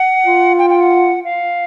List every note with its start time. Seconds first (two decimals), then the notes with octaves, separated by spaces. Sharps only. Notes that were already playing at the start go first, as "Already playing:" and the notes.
Already playing: F#5
0.26 F4
0.58 G5
0.70 G5
0.80 F#5
1.24 F5